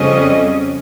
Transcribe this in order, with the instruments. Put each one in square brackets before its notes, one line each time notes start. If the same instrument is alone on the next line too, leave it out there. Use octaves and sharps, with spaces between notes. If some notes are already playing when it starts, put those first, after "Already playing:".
Already playing: [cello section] F2 C#3 G3 C#4 D#5